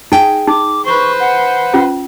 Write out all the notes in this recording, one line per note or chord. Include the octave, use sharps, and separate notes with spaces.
D#4 G#4 G5
D#4 D6
B4 C5 C#6
F#5
C#4 F4